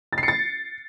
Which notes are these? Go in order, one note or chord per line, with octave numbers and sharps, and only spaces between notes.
A6
C7
C#7
A6